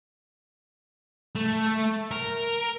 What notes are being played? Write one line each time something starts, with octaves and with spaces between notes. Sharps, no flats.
A3
A#4